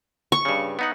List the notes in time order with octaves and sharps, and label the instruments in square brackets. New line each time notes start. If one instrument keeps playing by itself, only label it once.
[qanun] C#6
[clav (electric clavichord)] G2 C#3
B3 D#4 F#5